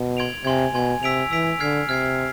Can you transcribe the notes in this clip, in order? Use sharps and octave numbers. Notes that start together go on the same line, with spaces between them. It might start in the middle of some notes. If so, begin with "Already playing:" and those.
Already playing: B2
C6 G#6 D7 F7
C3 G#5 C6 G#6
B2 G#5 C6 G#6
C3 E6 B6 D7 F7
E3 E6 B6 D7 F7
D3 F6 G#6 C7
C3 F6 G#6 C7